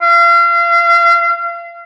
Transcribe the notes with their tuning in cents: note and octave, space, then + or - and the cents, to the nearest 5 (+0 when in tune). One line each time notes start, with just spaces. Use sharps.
F5 -35